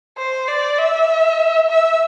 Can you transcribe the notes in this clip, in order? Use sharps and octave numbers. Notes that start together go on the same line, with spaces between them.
C5
D5
E5
E5